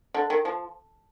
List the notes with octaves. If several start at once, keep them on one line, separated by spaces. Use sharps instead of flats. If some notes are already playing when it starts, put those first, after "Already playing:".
D3
D#3
F3